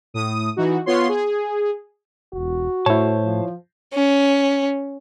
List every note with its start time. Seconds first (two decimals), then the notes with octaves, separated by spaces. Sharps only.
0.14 A2 D#6
0.56 E3 D#4 F#4
0.86 B3 F4 C#5 C6
1.08 G#4
2.33 E1 F#4
2.86 A2 E4 C5 C#5 A5
3.25 F3
3.94 C#4